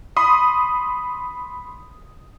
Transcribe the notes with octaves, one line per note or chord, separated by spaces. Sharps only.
B5 C6 D#6